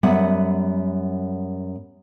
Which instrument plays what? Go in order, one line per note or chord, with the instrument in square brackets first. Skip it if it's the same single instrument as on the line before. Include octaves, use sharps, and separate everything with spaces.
[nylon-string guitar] F#2 G3 B3 E5 F#5